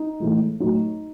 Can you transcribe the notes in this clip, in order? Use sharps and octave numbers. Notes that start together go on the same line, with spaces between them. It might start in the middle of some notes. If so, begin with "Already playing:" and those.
Already playing: D#4
A2 E3 G#3
A2 F#3 D#4